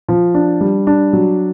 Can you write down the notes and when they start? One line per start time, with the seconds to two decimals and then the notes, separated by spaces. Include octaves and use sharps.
0.08 F3
0.35 D4
0.61 G3
0.87 D4
1.13 F#3